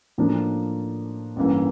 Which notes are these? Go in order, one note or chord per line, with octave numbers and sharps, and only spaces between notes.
A2 F3 A#3 D4
A1 G2 E3 A#3